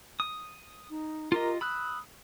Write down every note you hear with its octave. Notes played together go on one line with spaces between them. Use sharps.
D#6
D#4
F4 G4 A#4 D#5
B5 D#6 E6 F#6